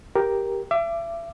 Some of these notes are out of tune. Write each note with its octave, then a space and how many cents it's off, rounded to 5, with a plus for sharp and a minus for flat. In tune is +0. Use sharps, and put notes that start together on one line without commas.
G4 +0 A#4 +10
E5 +35 D6 +5